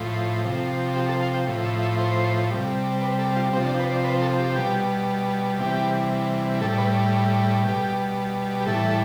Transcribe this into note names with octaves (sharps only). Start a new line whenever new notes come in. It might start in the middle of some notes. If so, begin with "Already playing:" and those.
Already playing: A2 F3
C3 F3
G4
A4
F5
G5
A2 F3
E5
E5
C5
C3 G3
B4
A4
F4
C3 F3 C4
D4
B4
D5
B4
A4
G4
B2 G3
C3 E3 G3 G4
A2 G3 A4
B4
B2 G3 G4
G4
A2 E3 G3 A4